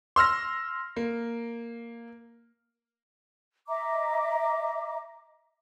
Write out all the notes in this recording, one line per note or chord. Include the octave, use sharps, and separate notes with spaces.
C6 E6 F6 A#6
A#3
D#5 E5 A#5 D6